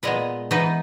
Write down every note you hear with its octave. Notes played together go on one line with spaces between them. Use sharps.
A#2 G#3 B3 B4 D#5
E3 B3 D#4 B4 D#5